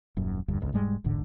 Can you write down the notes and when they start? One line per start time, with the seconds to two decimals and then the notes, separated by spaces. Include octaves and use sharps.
0.17 D#1 F#2
0.48 F1 D2 G2
0.60 G1 C#2
0.73 E1 G#2 G3 G#3
1.04 E1 A1 G#2 D3